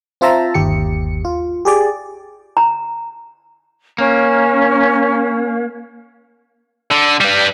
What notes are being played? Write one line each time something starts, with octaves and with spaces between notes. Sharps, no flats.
C4 F4 C5 E5 A5 A#5
G1 D#2 G4 C#7
F4
G4 G#4 D5
A#5
A#3 C#4
D3
G3 B4